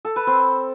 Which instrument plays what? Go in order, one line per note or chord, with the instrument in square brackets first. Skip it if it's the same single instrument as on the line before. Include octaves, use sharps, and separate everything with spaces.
[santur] A4
B4
C4 C5